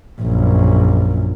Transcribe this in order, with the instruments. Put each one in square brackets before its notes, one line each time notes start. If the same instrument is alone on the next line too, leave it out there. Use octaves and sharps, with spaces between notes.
[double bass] A#1 F#2